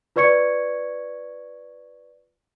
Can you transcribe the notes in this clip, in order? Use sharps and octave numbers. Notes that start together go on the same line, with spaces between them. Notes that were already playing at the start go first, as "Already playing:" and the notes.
F4 B4 D5 C#6 G#6 C#7